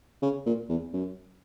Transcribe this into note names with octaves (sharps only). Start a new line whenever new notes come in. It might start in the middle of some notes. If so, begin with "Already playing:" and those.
C#3
A#2
E2
F#2